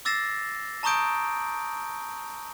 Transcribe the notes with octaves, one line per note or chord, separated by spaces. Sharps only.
D6 E6 A6 A#6 C7 E7
A5 A#5 C#6 D#6 G6 D7